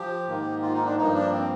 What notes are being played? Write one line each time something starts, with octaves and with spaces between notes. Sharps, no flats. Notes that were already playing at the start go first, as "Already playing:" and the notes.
Already playing: F3 G4
G#2 D#3 A#3
F4
D#4
D4
G2 F3 A#3 D#4
D4
C4